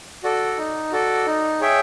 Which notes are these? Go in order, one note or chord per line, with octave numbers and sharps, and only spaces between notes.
F#4 A4 D5
D#4
F#4 A4 D5
D#4
G#4 C#5 E5 G5